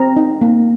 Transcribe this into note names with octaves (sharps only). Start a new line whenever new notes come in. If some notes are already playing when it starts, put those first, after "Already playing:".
Already playing: C4 A#5
D#4
A#3